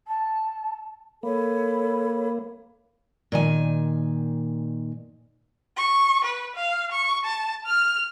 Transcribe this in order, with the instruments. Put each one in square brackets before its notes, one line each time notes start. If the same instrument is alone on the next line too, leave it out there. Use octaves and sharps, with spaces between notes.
[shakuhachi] A5
[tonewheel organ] A#3 [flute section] A4 C#5 B5
[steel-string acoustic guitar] A#2 D#3 G#5
[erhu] C#6
B4
F5
C#6
A5
F6